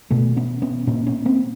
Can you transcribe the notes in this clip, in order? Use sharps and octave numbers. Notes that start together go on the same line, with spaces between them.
B2 A3 B3
B3 C#4
B3 C#4
A#2 B3 C#4
B3 C#4
A#3 C4